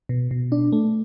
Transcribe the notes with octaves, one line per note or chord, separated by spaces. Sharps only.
B2
B2
D4
A3